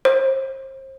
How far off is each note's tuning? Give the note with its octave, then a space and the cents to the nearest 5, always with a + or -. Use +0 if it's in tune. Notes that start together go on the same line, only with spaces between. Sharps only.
C5 +35